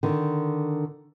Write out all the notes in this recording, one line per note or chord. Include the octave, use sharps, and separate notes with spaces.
D3 D#3